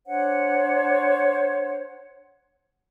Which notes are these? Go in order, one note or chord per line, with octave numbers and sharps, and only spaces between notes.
D4 C5 C#5 F#5